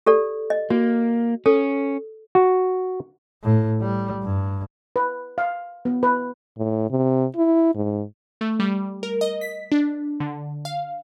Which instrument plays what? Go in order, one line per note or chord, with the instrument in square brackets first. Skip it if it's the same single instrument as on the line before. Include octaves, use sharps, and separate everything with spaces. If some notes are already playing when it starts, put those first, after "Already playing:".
[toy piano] G4 A4 D5
D#5
[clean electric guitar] A#3 [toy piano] F#4
[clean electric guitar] C#4 [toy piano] A4
[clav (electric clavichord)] F#4
[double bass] A2
G3
G2
[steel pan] B4
F5
B3
B4
[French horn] A2
C3
E4
G#2
[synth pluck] A3
G3
A#4
D#5
B6
D4
D3
F5